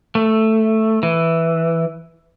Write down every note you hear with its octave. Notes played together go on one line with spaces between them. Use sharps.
A3
E3